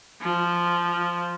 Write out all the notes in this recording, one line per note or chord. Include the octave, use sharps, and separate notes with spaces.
F3